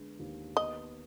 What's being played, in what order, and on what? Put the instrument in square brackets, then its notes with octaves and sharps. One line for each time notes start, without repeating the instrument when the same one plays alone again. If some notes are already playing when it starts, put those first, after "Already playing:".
Already playing: [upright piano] D3 G#3 B3
D#2
[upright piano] B3 [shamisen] D#5